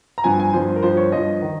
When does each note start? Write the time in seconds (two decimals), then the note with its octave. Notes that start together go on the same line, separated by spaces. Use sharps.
0.18 A#5
0.24 G2 F3 G#5
0.40 G#5
0.53 G2 F3 C5
0.76 A#4
0.83 G2 F3 C5
0.97 C#5
1.12 G2 F3 D#5
1.42 D#3